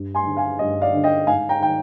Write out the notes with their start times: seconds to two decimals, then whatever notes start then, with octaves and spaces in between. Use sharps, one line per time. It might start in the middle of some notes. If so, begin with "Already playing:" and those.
Already playing: G2
0.15 G#5 C6
0.25 D3
0.37 F5 G#5
0.59 G2 D#5
0.82 D5 F5
0.94 D3
1.04 D#5 G5
1.27 G#2 F5 G#5
1.49 G5 A#5
1.60 D#3 G5